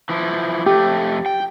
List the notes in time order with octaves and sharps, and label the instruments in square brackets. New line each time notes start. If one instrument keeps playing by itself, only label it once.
[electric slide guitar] E3 F3 E4
[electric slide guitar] F2 A3 [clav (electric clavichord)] G4
[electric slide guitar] G5